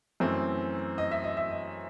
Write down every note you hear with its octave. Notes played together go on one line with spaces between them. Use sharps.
F#2 E3 A3 C4
D#5
E5
D#5
E5
D#5